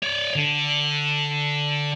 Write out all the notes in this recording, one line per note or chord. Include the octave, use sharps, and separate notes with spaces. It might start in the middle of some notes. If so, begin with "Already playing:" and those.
C#5 D5
D3